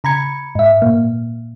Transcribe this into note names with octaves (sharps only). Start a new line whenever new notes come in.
C#3 A#5 B5 G#6 C#7
G#2 E5
A#2 A#3